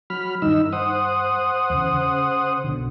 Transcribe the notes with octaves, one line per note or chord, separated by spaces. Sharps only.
F#3 B5 F6
G2 D#3 G3 D#4 E6
C5 F#5 D#6
E2 C#3
C#3
B1 B2 D3